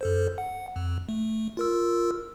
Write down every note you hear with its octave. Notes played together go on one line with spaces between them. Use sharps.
F#2 A4 C5
F#5
F2
A3
F4 A#4 E6